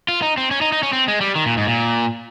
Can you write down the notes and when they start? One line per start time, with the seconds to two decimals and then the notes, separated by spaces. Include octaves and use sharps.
0.09 F4
0.22 D#4
0.37 C4
0.51 C#4
0.61 D#4
0.72 D#4
0.83 C#4
0.93 C4
1.08 G#3
1.21 G3
1.36 D#3
1.46 A#2
1.57 G#2
1.67 A#2